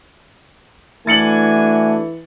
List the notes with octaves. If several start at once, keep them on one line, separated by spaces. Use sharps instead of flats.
E3 A3 D4 F#4 G#5 A6 C#7 F#7